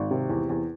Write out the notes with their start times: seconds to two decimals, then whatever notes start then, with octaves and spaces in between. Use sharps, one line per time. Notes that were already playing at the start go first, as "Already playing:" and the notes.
Already playing: G#1
0.11 C3
0.29 E2
0.49 E2